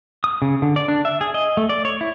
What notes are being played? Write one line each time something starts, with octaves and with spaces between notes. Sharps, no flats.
D#6
C#3
D3
D5
D4
E5
G#4
D#5
A3
D5
C#5
E4